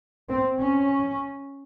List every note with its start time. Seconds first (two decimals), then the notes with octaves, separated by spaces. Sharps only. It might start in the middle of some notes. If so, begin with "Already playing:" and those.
0.29 C4
0.60 C#4